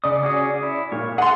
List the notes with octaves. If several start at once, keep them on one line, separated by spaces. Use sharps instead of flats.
C#3 D5 D#6
C#4 F#4 G#4
E4
A#2 C#5
G#4 A4 F#5 C6